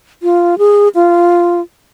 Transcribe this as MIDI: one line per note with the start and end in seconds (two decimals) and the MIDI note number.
0.23 0.58 65
0.58 0.88 68
0.95 1.61 65